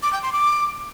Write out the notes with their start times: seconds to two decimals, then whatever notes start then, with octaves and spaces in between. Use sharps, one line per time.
0.03 D6
0.13 G5
0.23 C6
0.33 D6